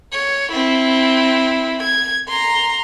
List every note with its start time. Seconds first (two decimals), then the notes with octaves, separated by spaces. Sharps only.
0.13 C#5
0.52 C4 E4
1.83 G#6
2.28 A#5 C6